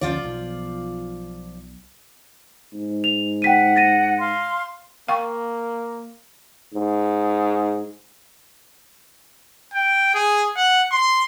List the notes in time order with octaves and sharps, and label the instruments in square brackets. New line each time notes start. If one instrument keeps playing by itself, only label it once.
[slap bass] D2 C#4 [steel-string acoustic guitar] F3 F4 D5
[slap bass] B1
[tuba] G#2
[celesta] F7
[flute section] F#5 [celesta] G5 B6 D#7
[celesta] A6 A#6 D#7
[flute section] F5 C6
[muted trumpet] A#3 [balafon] F5 G5 C#6
[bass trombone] G#2
[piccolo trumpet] G5
G#4
F#5
C6